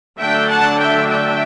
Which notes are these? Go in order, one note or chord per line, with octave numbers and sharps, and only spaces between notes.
D3 F#3 A3 D4 E5 G5
F#5 A5
E5 G5
E5 G5